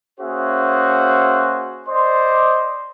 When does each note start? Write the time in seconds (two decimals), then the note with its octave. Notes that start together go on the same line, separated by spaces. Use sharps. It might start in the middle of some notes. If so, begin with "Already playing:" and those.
0.20 A#3 C#4 F#4 G#4 C5 E5
1.89 C5 D5 D#5 C6